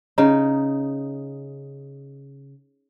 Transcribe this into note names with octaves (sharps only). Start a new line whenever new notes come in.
C#3 D#4